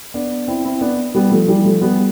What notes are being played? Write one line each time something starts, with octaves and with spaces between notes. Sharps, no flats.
B3 D4
C4 E4
C4 E4
B3 D4
G3 B3
F3 A3
E3 G3
F3 A3
G3 B3